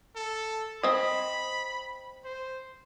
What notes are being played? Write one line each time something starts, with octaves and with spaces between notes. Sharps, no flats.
A4
C4 D#5 B5
C5